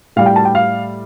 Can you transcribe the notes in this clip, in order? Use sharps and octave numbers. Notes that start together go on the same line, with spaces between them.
A2 G3 F5
G5
A5
G5
F5